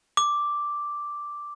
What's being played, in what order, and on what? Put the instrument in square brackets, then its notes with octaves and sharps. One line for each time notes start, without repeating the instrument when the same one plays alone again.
[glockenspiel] D6